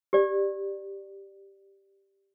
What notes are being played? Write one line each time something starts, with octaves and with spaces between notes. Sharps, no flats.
G4 D5